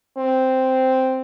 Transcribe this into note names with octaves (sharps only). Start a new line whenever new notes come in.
C4